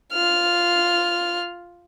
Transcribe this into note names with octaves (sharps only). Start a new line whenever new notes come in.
F4 F6